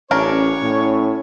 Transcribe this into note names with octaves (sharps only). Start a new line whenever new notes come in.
A1 C#4 D4 A#4 C#5
A2